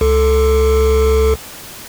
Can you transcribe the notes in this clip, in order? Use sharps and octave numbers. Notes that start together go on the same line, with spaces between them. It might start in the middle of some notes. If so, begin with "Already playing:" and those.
C#2 A4